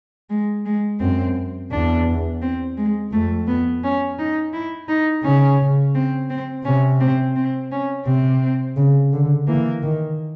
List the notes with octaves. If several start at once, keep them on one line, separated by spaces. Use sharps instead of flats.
G#3
G#3
F#2 C4
E2 D4
C4
G#3
F2 A3
B3
C#4
D#4
E4
D#4
C#3 C#4
C4
C4
C3 C#4
C4
C4
C#4
C3 C4
C#3
D3
E3 A#3
D#3